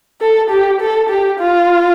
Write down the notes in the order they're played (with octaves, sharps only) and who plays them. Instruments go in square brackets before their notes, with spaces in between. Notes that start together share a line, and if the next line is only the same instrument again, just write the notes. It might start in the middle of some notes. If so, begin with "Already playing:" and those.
[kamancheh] A4
G4
A4
G4
F4